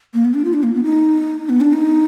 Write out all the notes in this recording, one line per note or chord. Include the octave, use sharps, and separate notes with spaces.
A#3
B3
D4
F4
D4
A#3
B3
D#4
B3
D4
D#4